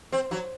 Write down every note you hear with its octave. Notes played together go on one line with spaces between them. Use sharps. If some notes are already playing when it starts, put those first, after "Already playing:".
C4
F#3